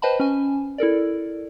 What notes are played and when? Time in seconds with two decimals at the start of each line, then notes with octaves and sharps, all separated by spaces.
0.02 B4 C5 D#5 G5 A5 B5
0.20 C#4 G#5
0.78 E4 A4 A#4 D5